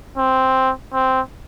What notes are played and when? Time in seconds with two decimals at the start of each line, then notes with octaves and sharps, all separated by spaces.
0.18 C4
0.94 C4